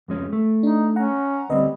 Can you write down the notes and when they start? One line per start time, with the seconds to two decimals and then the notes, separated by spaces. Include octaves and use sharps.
0.08 F2 G#3 C#4
0.33 A3
0.63 D4 D#4
0.96 C#4 F#5 A#5
1.50 D2 G3 C4 B4 D#5